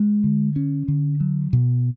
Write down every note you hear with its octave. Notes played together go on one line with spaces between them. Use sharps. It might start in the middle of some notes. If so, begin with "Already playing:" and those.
Already playing: G#3
D3
C#4
D3
F#3
B2